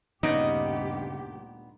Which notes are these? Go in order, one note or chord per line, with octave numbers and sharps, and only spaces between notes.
D2 G2 A#2 C#3 B3 D#4 G4 D#5